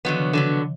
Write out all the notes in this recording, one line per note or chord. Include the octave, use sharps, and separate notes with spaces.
D3 D#3 F3 F#3 B3
C#3
D3 F#3 B3